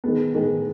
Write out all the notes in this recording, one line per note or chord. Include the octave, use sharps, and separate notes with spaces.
D#3 G#3 B3
D#3 G#3 B3